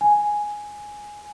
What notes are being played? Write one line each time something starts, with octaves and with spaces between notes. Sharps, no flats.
G#5